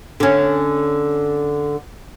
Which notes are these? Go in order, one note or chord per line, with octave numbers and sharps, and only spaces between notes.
D3 C#4